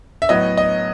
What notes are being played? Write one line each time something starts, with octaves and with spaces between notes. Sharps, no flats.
E5
A2 F#3 B3 D#5
D#5